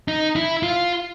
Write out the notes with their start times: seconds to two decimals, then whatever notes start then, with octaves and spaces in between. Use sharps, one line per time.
0.08 D#4
0.36 E4
0.63 F4